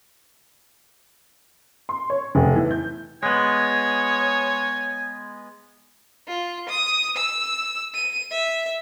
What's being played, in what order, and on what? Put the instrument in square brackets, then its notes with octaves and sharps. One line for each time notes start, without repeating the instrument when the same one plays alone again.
[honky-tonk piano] C6
C#5
F1
E3
G6
[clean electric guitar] G#3 B3 [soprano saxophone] C#5 [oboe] G#5
[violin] F4
D#6
E6
D#7
E5